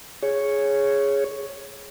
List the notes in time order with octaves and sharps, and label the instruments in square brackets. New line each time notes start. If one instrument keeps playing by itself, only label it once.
[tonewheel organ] G#4 C#5